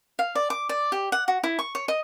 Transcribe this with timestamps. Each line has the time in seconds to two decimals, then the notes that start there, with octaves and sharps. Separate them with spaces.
0.19 F5
0.35 D5
0.50 D6
0.69 D5
0.92 G4
1.12 F#5
1.28 F#4
1.44 E4
1.59 C#6
1.75 C#5
1.88 D#5